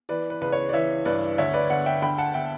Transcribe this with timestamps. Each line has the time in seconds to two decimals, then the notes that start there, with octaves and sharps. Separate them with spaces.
0.09 E3 B4 D5
0.30 B4
0.41 C#2 B4
0.52 C#5
0.69 D5
0.73 E3 C#5 E5
1.05 G2 B4 D5
1.38 D2 C#5 E5
1.54 B4 D5
1.70 D2 D5 F#5
1.86 E5 G5
2.02 D3 G5 B5
2.18 F#5 A5
2.34 D3 E5 G5